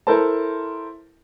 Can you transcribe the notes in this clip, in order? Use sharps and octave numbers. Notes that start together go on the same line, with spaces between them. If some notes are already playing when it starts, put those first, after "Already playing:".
E4 A4 A#4 C5 A5